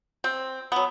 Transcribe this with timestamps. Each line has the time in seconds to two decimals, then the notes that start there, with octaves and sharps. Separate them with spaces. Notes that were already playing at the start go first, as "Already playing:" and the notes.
0.24 C4
0.72 F#3 B3